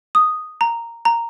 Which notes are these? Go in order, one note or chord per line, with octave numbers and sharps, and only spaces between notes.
D#6
A#5
A#5